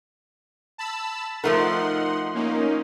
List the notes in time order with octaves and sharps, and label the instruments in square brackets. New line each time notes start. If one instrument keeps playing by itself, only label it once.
[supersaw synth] A5 B5 E6
[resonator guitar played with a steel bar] F3 A3 A#4 [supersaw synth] D#4 F#5 C6
[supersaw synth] A#3 C#4 D#4